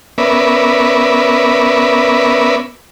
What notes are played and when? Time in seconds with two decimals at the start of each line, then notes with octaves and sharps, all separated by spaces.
0.18 B3 C#4 A#4 B4 D5 E5